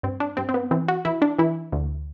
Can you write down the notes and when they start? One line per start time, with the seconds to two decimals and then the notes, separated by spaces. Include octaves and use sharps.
0.03 G2 C4
0.20 D4
0.37 G2 C4
0.49 C4
0.54 B3
0.71 E3 C4
0.88 F#4
1.05 E3 E4
1.22 D4
1.38 E3 E4
1.72 D2